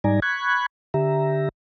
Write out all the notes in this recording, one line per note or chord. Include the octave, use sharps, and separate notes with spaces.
G#2 G3 D#4 D5 G#5 A#5
B5 C#6 F#6 G#6
D3 G4 E5 A#5